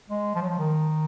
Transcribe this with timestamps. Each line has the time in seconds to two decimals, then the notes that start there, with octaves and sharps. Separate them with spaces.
0.10 G#3
0.35 F3
0.42 F#3
0.49 F3
0.59 D#3